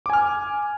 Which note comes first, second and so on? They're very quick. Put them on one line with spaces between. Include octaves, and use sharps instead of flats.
D6 G#5 F6